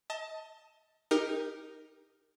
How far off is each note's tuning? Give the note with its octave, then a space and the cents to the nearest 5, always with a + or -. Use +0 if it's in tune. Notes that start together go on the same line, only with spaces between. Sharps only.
D#5 +30 A5 +15
D#4 +0 G4 +25 A#4 +0